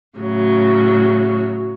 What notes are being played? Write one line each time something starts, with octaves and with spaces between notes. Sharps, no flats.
A2 C#3 F#3